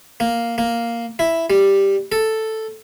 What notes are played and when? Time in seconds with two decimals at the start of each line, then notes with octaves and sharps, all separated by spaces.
0.20 A#3
0.58 A#3
1.19 E4
1.50 G3
2.12 A4